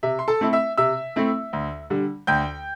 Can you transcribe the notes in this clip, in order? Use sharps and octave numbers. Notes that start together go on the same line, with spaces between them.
C3 E5
C6
A4 A5
A3 C4 E4
E5 E6
C3 E5 E6
A3 C4 E4
D2
D3 G3
D2 G5 G6